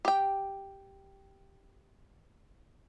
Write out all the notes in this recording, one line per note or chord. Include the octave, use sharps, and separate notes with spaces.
G4 G5